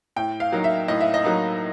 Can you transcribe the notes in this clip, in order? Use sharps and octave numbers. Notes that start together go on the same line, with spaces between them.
A2 G5
F5
F#3 A#3 D#4
E5
A2 D#5
E5
D#5
F#3 A#3 D#4